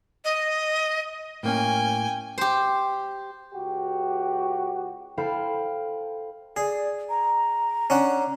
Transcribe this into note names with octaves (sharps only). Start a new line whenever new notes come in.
D#5
A2 A#3 C#4 G5 G#5
G4 C5
C#2 F#4 G4
E4 A4 C5 F5 G5 B5
G#4 D5
A#5
C#4 D4 F#5